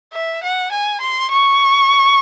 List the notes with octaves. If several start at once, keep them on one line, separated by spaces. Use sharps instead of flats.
E5
F#5
G#5
C6
C#6